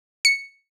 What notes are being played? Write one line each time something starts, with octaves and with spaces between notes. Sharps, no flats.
C#7